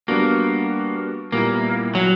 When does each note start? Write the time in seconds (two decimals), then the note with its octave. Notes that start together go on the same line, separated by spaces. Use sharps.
0.08 G3 A#3 B3 D4 F#4
1.32 A#2 G3 A#3 B3 E4
1.95 F#3